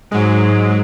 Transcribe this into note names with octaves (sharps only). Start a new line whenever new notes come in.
G#2 F#3 G#3